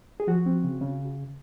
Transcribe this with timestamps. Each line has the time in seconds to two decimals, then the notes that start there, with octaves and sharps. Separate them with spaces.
0.20 G#4
0.27 F3 F#4
0.46 C4
0.64 C#3
0.81 C#3